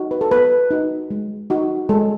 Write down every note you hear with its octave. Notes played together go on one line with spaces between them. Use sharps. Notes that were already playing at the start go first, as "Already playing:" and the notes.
Already playing: D#4 F#4
B4
A4
B3 B4
D#4 F#4
G#3
D#4 F#4
G#3 A4